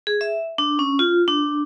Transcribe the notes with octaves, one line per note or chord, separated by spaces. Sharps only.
G#4
E5
D4
C#4
F4
D4